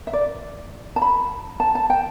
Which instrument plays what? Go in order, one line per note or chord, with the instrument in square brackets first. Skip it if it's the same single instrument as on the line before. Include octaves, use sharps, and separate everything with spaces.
[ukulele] E5
D5
A5
B5
A5
A5
G5